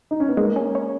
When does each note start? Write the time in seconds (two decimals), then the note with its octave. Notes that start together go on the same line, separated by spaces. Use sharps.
0.11 D#4
0.20 C#4
0.29 B3
0.37 G#3 A#3
0.56 C#4
0.75 C#4